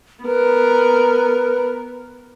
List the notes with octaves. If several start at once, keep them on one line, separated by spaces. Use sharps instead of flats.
B3 A#4 B4